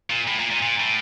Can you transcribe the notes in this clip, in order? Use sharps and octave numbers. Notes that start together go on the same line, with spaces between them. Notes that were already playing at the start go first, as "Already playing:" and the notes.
A#2
A2
A#2
A#2
A#2
A2